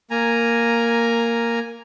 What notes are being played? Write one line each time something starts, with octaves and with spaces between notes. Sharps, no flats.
A#3 G#5 A#5